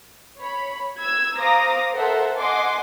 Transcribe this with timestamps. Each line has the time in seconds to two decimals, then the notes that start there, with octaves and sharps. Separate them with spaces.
0.38 C#5 B5
0.98 E6 G#6
1.37 C5 F5 A#5 D6 D#6 A#6
1.94 A4 A#4 C5 E5 F#5
2.37 D#5 F#5 G#5 C6 D6